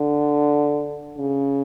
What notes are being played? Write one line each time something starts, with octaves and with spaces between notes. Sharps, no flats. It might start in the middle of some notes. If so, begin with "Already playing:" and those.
Already playing: D3
C#3